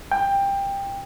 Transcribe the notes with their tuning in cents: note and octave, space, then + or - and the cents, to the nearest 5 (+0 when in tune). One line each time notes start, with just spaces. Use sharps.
G5 +15